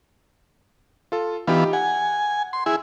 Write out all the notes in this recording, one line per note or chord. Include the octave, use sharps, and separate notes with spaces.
F4 A4
E3 B3 D#4 F4 G4
F#5 G#5
C6
E4 G#4